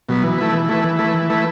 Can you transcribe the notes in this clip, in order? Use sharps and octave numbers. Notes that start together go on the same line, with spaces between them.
B2 F#3 B3
E3
A3 E4 B4
E3
A3 E4 B4
E3
A3 E4 B4
E3
A3 E4 B4